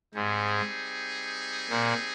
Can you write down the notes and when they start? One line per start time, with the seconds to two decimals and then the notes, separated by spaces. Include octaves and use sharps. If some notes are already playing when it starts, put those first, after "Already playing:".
0.14 G#2 G3 C4 D#4 G#4
1.70 A#2